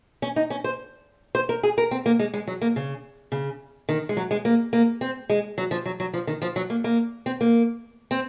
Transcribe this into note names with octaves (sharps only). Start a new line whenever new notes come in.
C#4
D#4
C#4
C5
C5
A#4
G#4
A#4
C4
A#3
G#3
G#3
F#3
A#3
C#3
C#3
D#3
G#3
F#3
G#3
A#3
A#3
C4
G#3
F#3
F3
F#3
F#3
F3
D#3
F3
F#3
A#3
A#3
C4
A#3
C4